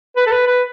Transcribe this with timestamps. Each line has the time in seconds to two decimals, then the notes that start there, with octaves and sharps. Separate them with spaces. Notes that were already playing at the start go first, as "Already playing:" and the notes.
0.16 B4
0.27 A4
0.31 B4
0.47 B4